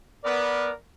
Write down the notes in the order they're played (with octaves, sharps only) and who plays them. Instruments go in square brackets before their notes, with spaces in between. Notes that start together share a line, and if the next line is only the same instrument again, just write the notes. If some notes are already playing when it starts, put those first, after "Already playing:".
[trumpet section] B3 [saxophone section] A#4 D5